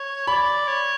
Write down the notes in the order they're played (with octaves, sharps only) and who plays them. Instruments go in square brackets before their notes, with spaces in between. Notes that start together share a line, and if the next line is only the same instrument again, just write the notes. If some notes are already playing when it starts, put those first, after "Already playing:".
Already playing: [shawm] C#5
[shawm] D5 [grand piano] B5
[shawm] C#5